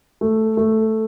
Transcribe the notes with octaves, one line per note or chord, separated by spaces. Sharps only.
A3
A3